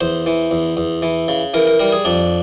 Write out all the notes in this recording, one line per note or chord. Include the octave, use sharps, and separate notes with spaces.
E2 C5
E3
E2
E2
E3
C#3
E3 A#4
A#4
G3 A#4
G#4
F2 D4